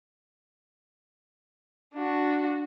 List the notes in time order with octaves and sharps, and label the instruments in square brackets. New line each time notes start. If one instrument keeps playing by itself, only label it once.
[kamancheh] D4 F#4